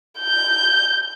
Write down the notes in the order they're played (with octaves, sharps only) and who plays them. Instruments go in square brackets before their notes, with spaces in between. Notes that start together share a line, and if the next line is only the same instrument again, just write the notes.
[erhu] G6